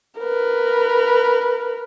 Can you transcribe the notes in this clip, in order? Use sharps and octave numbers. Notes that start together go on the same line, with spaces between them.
A#4 B4